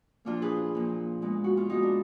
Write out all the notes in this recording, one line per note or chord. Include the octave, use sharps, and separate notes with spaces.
A#2 F3 A#3 D4 F4
G#4 B4
A#2 F3 A#3
A#2 G#3 B3
F#4
F4
A#2 G#3 B3 D#4
D4